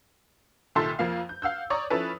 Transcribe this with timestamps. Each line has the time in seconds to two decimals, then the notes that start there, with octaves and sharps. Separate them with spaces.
0.75 C2 A#2 D#3 A4 E5 C6
0.99 F2 F3 A#3 F5
1.29 G6
1.42 F5 F#5 E6 G6
1.70 C#5 D5 A#5 C#6 D#6
1.90 F3 C#4 E4 A4 B4